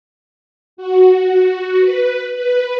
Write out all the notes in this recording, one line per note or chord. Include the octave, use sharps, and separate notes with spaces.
F#4
B4
B4